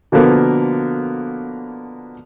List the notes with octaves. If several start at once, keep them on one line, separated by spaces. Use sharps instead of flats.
B2 D3 F3 A#3 B3 A#4